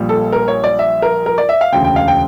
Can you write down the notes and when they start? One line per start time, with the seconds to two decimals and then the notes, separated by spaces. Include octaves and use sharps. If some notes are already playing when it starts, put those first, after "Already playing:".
Already playing: A#1 A#2 G3
0.09 A4
0.33 A#4
0.48 C#5
0.64 D5
0.79 E5
1.02 A#4
1.26 A#4
1.38 D5
1.49 E5
1.61 F5
1.72 E1 D2 C#3 G5
1.84 G5
1.96 F5
2.08 G5